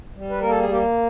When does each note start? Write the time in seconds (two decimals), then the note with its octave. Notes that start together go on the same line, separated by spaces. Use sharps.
0.15 G3
0.30 B4
0.40 A#3 A#4
0.49 A4
0.60 G#4
0.69 A#3 G4